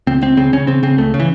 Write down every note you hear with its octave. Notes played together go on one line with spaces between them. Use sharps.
C#2 C4
C#2 C4
C#3 C4
C#3 C#4
C#3 C4
C#3 C4
C#2 A3
C#3
E3